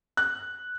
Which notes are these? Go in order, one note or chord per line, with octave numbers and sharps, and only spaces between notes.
F#6